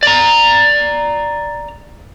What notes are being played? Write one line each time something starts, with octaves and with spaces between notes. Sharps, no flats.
D5 A#5